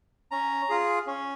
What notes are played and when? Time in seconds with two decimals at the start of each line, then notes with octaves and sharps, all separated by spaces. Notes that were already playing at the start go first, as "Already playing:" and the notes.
0.31 C#4 A#5
0.69 F4 G#4
1.07 C#4